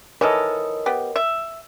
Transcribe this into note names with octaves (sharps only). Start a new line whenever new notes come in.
E3 D#4 A4 A#4 C#5 D#5
B3 G4
E5